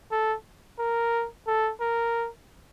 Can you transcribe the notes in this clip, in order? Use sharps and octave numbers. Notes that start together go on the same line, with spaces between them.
A4
A#4
A4
A#4